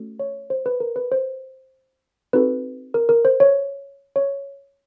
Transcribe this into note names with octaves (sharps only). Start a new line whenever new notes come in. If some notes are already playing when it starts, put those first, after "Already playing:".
Already playing: A3 C#4 F#4 A4
C#5
C5
B4
A#4
B4
C5
C4 D#4 F#4 A4 B4
A#4
A#4
C5
C#5
C#5